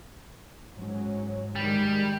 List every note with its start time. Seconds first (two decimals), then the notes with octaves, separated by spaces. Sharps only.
0.75 G#2 F#3 C#4
1.56 D#3 G3 G#3